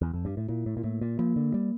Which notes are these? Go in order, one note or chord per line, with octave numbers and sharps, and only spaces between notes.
E2
F2
G2
A2
A#2 E4
A2
A#2
A2 A#3
A#2
F3 A#3
D3
G3 A#3